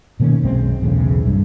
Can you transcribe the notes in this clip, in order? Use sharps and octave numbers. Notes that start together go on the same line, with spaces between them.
B2 D#3 A#3 C#4
B1 F#2 G#3 C4
B1 E2 A2 C#3
C2 G2